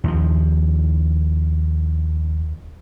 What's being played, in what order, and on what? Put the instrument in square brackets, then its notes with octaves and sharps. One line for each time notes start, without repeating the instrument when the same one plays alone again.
[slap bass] D#2 F3